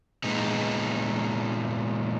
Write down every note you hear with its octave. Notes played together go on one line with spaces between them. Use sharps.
A#2 G#3 B3 D#4